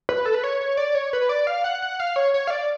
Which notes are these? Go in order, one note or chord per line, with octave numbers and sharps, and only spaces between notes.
B4
A4
B4
C#5
C#5
D5
C#5
B4
D5
F5
F#5
F#5
F5
C#5
C#5
F5
D5